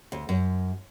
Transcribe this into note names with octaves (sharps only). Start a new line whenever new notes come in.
D2
F#2